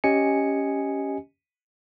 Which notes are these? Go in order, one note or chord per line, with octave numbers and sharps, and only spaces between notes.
C#4 G4 D#5 G#5 C#7